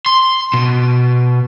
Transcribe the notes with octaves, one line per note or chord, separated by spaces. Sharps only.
C6
B2